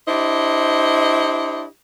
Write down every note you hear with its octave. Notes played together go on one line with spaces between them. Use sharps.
D4 E4 G4 C5 D#5